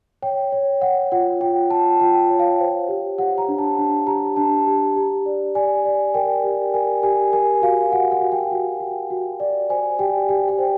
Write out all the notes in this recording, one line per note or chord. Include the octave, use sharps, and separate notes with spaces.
C#5 G5
C#5
C#5 F#5
F4 F#5
F4 G5
F4 A5
F4 G5
C#5
F5
C5
G4
G4 F#5
A#5
D4
A5
D4
G4 A#5
D4 A5
G4
G4
D5
D5 G#5
D5
A#4 G5
G4
A#4 G#5
G4 G#5
A#4 G#5
F#4 F5
F#4 F#5
F#5
F#4
G5
F#4
F#4
F#4
D5
C5 G#5
G4 G5
G4 G5
G5
C5